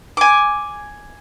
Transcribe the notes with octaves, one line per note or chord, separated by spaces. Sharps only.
G#5 D6